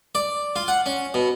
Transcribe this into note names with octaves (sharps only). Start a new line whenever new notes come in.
D5
F4
F#5
C#4
B2